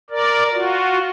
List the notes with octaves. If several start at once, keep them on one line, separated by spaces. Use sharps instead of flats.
A#4 D5
F4 F#4